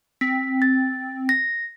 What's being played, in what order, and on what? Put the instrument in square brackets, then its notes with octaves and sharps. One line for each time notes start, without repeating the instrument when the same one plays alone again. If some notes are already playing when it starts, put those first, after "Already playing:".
[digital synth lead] C4 [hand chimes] B6
[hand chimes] A6
A#6